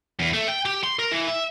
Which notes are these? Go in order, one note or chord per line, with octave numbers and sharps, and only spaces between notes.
E2
A3
G5
G4
C6
A#4
E3
E5